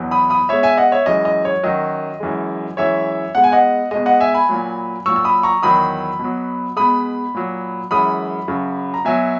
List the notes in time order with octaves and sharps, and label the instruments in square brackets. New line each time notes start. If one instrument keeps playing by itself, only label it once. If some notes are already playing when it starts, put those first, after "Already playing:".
Already playing: [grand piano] E2 B2 F#3
B5 D#6
B5 D#6
B2 G#3 C#5 E5
E5 G#5
D#5 F#5
C#5 E5
F#2 E3 G#3 D#5
D#5
C#5
F#2 D#3 F#3 D#5
F#2 E3 G#3
F#2 E3 G#3 C#5 E5
B2 G#3 F#5
G#5
D#5 F#5
B2 G#3 D#5
D#5 F#5
E5 G#5
G#5 B5
A#2 F#3
A#2 F#3 C#6 E6
E6
B5 D#6
A#5 C#6
E2 D#3 F#3 B5 D#6
B2 F#3
B2 G#3 B5 D#6
A#2 F#3
F#2 E3 G#3 B5 D#6
F#2 C#3 F#3
A#5
B2 F#3 E5 G#5